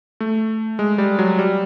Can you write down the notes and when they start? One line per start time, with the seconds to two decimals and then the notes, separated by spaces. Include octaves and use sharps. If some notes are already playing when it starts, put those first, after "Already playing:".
0.20 A3
0.79 G#3
0.98 G3
1.19 F#3
1.39 G3